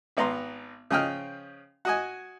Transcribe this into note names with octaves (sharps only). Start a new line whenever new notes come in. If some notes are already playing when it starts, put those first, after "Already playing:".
G#1 B3 A#5 C6
C#3 F3 D#5 G5 F6
F#4 D#5 G#5